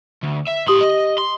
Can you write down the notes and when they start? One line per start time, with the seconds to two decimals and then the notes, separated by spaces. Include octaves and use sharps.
0.23 D2
0.48 E5
0.67 A2 G4 C6 D#6 F#7
0.81 D#5
1.18 C6